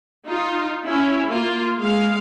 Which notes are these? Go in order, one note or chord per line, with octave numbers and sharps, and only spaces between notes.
D#4 F4
C#4 E4
A#3 F4
G#3 F5